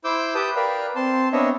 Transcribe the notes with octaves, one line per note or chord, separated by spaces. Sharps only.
E4 C5 D6 E6 G6
G4 B4 G5 A5 D#6 G6
A#4 B4 D5 F5 G5
C4 A5 C6
B3 C4 D4 C#5 D#5 E5